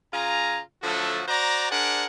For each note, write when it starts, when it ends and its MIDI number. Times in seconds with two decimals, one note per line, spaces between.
0.13 0.60 49
0.13 0.60 65
0.13 0.60 80
0.13 0.60 82
0.83 1.23 50
0.83 1.23 53
0.83 1.23 54
0.83 1.23 57
0.83 1.23 66
0.83 1.23 69
1.28 1.70 66
1.28 1.70 72
1.28 1.70 74
1.28 1.70 82
1.71 2.04 62
1.71 2.04 68
1.71 2.04 70
1.71 2.04 72
1.71 2.04 74
1.71 2.04 78